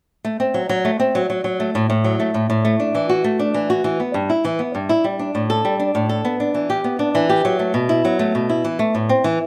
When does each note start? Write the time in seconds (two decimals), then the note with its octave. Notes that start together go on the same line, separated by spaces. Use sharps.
0.25 A3
0.40 C4
0.54 F#3
0.69 F#3
0.85 A3
1.00 C4
1.15 F#3
1.30 F#3
1.44 F#3
1.60 A3
1.75 A2
1.90 A2
2.04 F#3
2.20 A3
2.34 A2
2.50 A2
2.65 A3
2.80 D4
2.95 E3
3.09 F#4
3.24 A3
3.39 D4
3.54 E3
3.70 F#4
3.84 E3
4.00 B3
4.14 G2
4.30 E4
4.45 E3
4.59 B3
4.75 G2
4.89 E4
5.04 G3
5.19 D4
5.35 A2
5.50 A4
5.65 G3
5.80 D4
5.95 A2
6.09 A4
6.25 B3
6.40 D4
6.54 E3
6.70 G4
6.84 B3
6.99 D4
7.15 E3
7.29 G4
7.45 F#3
7.59 A3
7.74 B2
7.89 E4
8.05 F#3
8.19 A3
8.35 B2
8.50 E4
8.65 E3
8.79 A3
8.95 A2
9.09 C4
9.24 E3